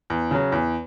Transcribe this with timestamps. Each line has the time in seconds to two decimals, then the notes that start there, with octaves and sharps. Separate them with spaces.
0.10 E2
0.31 C#3 F#3
0.52 E2